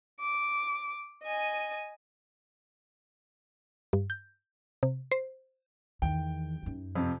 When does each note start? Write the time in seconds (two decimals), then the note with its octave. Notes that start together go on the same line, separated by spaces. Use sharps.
0.20 D6
1.24 D#5 G#5
3.93 G2
4.10 G6
4.83 C3
5.12 C5
6.02 E2 D#3 G5
6.63 F#2 D#4
6.96 F2 C3